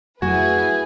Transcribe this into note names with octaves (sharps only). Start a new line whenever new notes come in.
F2 F#3 A3 E4 F#4 G#4 B4 G#5